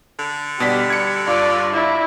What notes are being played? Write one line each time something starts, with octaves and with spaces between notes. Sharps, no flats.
D3
B2 G3 D4 B6
G#6 C#7
G2 F4 D5
E4 D5